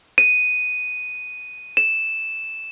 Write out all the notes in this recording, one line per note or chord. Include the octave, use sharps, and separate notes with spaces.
D#7
E7